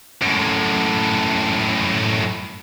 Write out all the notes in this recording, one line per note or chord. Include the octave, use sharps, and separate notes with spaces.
F#2 A2